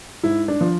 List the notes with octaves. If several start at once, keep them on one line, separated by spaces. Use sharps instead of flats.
G#2 E4
D4
F3